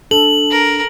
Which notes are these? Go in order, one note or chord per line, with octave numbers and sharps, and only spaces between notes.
D4 A4 F#7
A#4